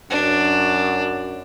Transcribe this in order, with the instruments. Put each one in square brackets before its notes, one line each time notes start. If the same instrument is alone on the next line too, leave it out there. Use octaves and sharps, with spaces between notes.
[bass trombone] F#2 [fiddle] D4